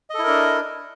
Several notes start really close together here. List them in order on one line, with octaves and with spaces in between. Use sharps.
D#5 A4 E4 A#4 D4